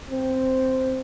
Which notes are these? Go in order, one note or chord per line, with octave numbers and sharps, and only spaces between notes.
C4